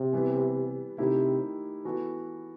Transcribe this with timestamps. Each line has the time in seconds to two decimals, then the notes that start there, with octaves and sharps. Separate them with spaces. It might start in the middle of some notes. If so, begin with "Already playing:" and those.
Already playing: C3
0.13 E3 G3 B3
0.98 C3 D#3 A3 E4 G4
1.85 E3 B3 F#4 A4